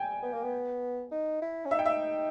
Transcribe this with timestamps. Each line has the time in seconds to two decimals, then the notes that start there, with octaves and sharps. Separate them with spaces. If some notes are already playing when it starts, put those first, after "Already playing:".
Already playing: G5 G#5
0.22 B3
0.33 A#3
0.43 B3
1.12 D#4
1.42 E4
1.65 C#4
1.71 D#4 E5
1.79 G5
1.86 E5